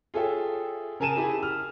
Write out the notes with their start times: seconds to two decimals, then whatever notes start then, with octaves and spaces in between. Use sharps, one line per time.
0.14 F4 G#4 A4 C#5 E5 G5
1.00 C#3 A#4 G#5 A5 D#7 E7
1.16 E4 G4 G#4
1.43 F6